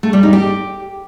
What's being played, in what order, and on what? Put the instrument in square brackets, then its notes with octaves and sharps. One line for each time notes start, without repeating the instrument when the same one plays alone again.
[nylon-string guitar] A3
G3
D#4
G4